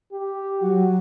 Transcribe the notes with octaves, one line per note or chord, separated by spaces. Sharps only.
G4
F#3 F#4